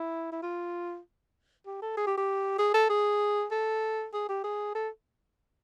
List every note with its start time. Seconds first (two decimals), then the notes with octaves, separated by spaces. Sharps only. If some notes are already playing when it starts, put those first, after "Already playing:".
Already playing: E4
0.32 E4
0.43 F4
1.66 G4
1.82 A4
1.97 G#4
2.07 G4
2.18 G4
2.59 G#4
2.74 A4
2.90 G#4
3.51 A4
4.13 G#4
4.29 G4
4.44 G#4
4.75 A4